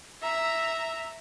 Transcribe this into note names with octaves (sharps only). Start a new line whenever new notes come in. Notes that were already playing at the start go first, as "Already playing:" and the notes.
E5 A#5